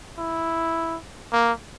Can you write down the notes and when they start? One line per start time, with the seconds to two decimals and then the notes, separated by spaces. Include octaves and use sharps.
0.18 E4
1.32 A#3